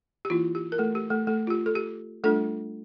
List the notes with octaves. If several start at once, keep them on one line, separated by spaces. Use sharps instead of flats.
G4
E3 A#3 E4 F4
G4
A#4
A3 A4
G4
A3 A4
A3 A4
F4
G4
A4
G4
G3 A3 D4 F4 A4